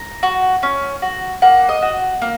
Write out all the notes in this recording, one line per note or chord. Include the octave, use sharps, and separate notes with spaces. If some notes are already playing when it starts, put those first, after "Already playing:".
Already playing: A#5
F#4
C#4
F#4
A#3 F#5
D#5
F#4
A#3